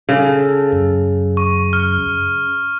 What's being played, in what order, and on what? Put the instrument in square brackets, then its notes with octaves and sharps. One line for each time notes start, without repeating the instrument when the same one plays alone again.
[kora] C#3 [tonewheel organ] A4
[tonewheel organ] F#2
[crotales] C#6
F6